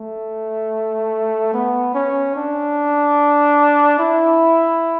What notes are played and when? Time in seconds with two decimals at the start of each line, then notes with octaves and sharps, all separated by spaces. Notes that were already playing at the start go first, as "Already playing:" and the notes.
Already playing: A3
1.53 B3
1.94 C#4
2.36 D4
3.99 E4